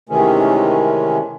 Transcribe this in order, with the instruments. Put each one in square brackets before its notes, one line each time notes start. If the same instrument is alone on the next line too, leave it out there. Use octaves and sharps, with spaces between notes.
[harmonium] C3 D#3 E3 G#3 A3 C#4